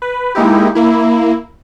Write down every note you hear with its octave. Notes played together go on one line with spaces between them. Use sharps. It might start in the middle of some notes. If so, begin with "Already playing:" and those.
B4
G#3 A#3 D#4 E4 G4
A#3 E4